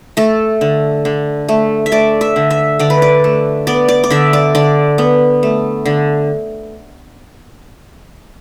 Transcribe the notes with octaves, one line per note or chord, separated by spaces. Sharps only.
A3 A4
D3
D3
A3
E5
A3 D5
E5
D3
E5
D3 D5
B4
D5
A3
B3 D5
D5
D5
D3 E5
D5
D3 D5
B3
A3
D3